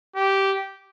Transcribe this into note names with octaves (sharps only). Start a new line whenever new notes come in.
G4